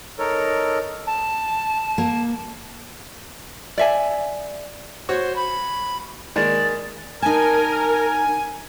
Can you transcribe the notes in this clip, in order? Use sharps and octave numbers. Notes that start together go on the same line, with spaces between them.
D#4 A4 A#4 C#5
A5
A#3
D5 E5 G#5
F#4 C5 C#5 C#6
B5
D#3 G#3 A#3 D5
D#4 A#4 G#5 A5